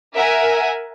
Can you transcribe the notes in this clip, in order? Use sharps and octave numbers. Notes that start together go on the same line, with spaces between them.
A#4 E5 F#5 G#5